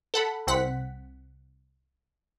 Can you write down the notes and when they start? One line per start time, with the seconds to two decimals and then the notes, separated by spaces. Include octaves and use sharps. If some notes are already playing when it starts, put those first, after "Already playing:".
0.14 A4 F#5 B5
0.47 C2 C4 F#5 B6